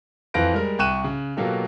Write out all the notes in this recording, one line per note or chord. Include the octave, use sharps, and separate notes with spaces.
F2 E3 B4 F5 A#6 D7
G3 G#3 A#4
C2 G5 C#6 F#6 D#7 E7
C#3
B2 F#3 A#3 F4 G4 A4